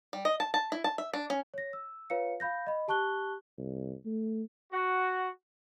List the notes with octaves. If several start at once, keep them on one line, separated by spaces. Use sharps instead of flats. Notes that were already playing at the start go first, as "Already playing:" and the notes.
G3
D#5
A5
A5
E4
A5
E5
D4
C#4
C#5 A#6
E6
F4 B4 C#5 F5 C#7
F5 B5 G6 A#6
D#5 B5
G4 A5 C#6 F#6 G7
C2
A3
F#4